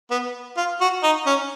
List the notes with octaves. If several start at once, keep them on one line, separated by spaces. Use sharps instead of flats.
B3
F4
F#4
D#4
C#4